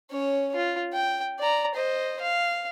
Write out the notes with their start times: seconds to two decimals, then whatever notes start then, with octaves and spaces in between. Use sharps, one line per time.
0.11 C#4 C#5
0.55 F4
0.93 G5
1.39 D5 A#5
1.75 C5 D#5
2.21 F5